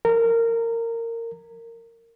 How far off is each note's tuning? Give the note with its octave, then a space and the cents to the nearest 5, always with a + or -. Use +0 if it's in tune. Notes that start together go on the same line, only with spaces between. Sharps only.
A#4 -20